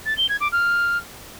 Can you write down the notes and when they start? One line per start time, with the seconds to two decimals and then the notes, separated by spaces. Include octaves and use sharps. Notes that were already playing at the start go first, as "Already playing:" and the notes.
0.06 A6
0.17 G7
0.29 G#6
0.41 D6
0.52 F6